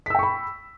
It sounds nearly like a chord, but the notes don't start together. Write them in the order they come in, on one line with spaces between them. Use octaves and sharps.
B6 E6 G5 C#6 B5